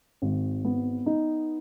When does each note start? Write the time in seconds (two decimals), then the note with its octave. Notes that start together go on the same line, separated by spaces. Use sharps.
0.22 G#1
0.65 B3
1.06 D#4